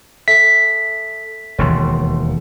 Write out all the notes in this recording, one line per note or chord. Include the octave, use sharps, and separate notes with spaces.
A4 E5 B6
E1 D#2 C#5 C6